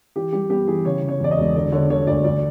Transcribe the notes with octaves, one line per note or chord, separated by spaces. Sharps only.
E3 G4
G3 G4
B3 G4
E3 G#4
C#3 C#5
C#3
C#5
E2 D5
D#5
E1
D3 D5
D3 C#5
D3 C#5
D2 D5
D2 D5